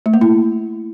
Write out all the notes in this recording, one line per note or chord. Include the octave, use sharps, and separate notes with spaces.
A3
A#3
E4